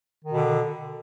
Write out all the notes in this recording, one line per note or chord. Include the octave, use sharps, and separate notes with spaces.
B2 D3 D#3